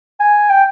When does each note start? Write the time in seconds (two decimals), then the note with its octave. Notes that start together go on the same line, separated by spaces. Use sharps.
0.20 G#5
0.49 G5